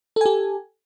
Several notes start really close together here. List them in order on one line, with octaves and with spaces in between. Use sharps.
A4 G#5 G4